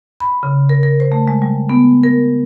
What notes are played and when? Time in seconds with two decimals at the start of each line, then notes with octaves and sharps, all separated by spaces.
0.20 B5
0.43 C#3
0.69 A#4
0.83 A#4
1.00 C5
1.12 A3
1.28 G#3
1.42 G3
1.69 B3
2.03 A#4